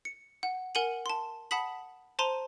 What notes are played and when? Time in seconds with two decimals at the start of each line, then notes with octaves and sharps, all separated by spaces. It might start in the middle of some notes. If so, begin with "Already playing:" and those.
0.05 C#7
0.43 F#5
0.75 A#4 F#5 G#5 C#7 D#7 F#7
1.06 A5 C6
1.51 F#5 A5 B5 D#6 B6 F#7
2.19 C5 A5 A#5 C6 D#7